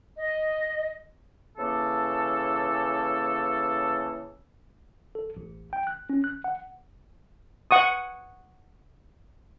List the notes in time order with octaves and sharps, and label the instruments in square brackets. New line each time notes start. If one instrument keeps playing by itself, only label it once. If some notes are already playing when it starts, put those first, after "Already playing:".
[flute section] D#5
[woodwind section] C#3 E3 A#3 A4
[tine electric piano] A4
A1
G5
F#6
C#4
F#6
F#5
[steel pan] F#5 C#6 D#6